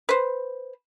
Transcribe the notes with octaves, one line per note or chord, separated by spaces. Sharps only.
B4 C5